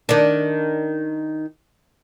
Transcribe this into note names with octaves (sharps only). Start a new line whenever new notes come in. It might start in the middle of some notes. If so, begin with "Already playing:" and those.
D#3 D4